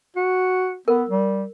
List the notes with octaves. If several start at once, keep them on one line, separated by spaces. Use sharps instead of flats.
F#4
B3 A#4
G3